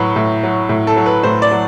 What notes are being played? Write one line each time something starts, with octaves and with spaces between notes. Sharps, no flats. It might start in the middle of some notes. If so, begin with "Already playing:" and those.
Already playing: A2 F#3 B4
A2
F#3
A2
A4
F#3
B4
A2 C5
D5
F#3